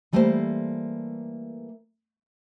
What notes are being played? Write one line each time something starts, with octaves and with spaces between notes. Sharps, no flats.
E3 G3 A3 A#3 A4 C5